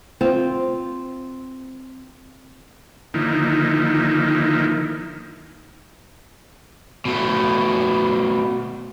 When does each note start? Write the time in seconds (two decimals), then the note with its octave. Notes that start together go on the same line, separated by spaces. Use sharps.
0.21 C4 F4
3.14 D3 D#3 F3 A#3 D#4 E4
7.05 B2 A3